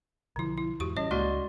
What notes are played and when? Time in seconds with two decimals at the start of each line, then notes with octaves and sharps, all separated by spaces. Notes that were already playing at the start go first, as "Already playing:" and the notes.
0.36 B1 D3 F3 E4
0.57 E4
0.80 E2 G#2 F#4 G4 C#6
0.97 A1 G3 C#4 C#5 D#5
1.11 C#2 G#3 A#3 F#4 D5 C6